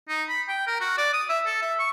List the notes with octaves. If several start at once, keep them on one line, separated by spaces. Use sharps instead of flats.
D#4
B5
G5
A#4
F#4
D5
D#6
E5
A4
E5
C#6